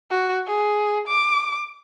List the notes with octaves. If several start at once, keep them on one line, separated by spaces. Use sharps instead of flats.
F#4
G#4
D6